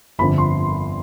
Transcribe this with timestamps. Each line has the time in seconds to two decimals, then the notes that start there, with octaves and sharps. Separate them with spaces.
0.19 G1 F2 D3 B5
0.38 C6